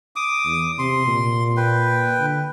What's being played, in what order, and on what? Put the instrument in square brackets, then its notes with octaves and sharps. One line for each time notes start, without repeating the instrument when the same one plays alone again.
[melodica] D6 D#6
[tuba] E2
[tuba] C3 [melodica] C6
[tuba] A#2
[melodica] B4 G5
[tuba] D3